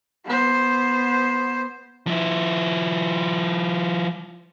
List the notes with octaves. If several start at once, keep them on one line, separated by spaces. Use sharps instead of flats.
B3 C5
F3 E4